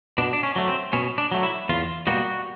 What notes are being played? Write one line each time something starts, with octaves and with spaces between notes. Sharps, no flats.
B2 D4
D4
C#4
F#3 A3
C4
B2 C#4
D4
F#3 A3
E4
E2 F4
B2 G3 A#3 F#4